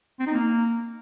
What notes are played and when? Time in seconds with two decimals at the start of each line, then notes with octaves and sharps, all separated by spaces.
0.20 C4
0.27 D#4
0.33 A#3